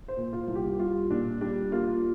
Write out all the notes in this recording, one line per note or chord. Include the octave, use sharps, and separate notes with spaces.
C5
A#2
F4
C2
G4
G3 F4
A#2 D4
G3 D4
A#3 F4